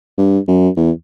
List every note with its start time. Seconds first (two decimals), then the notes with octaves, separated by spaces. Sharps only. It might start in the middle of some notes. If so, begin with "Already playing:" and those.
0.18 G2
0.48 F#2
0.77 E2